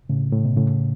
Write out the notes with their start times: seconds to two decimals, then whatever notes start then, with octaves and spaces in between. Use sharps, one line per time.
0.09 A2 C#3
0.33 A2
0.45 B2
0.57 A2 C#3